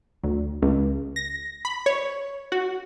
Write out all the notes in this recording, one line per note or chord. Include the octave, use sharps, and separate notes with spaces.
D2
C#2
A#6
B5
C#5
F#4